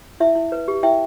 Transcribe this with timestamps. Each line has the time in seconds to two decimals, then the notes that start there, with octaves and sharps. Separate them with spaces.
0.20 E4 E5
0.35 E4
0.52 B4
0.68 G4
0.83 E4 E5 G5